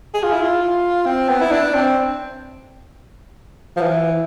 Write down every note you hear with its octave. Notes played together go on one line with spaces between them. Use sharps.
G#4
F4
E4
F4
C4
B3
E4
D4
C4
F3
E3